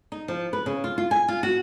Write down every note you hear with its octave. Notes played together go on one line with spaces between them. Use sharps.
D#4
F3
B4
C#3
F4
F4
G#5
F4
F#4